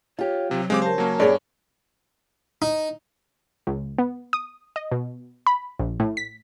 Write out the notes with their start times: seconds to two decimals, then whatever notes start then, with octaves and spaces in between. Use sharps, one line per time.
0.19 F4 G4 C#5
0.51 C3 F#3
0.70 C#3 G#3 C4 G4 F5 D6
0.82 A#4 C5 A5
0.98 F#3 A#3 C#4
1.20 G2 B3 G#4 C#5 D5
2.62 D#4
3.67 C#2
3.98 B3
4.33 D#6
4.76 D#5
4.91 B2
5.47 B5
5.80 A#1
6.00 A2
6.17 B6